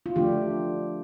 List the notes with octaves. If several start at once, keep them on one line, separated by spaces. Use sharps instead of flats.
F4
D3 F3 A3 D4 G4